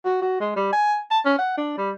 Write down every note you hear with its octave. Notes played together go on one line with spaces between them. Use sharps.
F#4
F#4
G#3
G3
G#5
A5
C#4
F#5
D4
G3